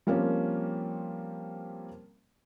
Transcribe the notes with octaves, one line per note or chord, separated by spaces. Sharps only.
F3 G3 A#3 C4 C#4